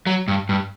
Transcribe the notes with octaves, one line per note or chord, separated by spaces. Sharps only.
F#3
G2
G2